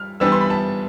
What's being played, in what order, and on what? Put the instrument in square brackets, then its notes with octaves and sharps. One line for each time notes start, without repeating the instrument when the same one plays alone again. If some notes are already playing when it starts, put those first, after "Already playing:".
Already playing: [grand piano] G3 F6
E3 G3 B3 D4 E6
C6
B5
A5